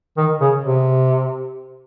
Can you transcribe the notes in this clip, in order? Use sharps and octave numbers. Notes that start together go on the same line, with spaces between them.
D#3
C#3
C3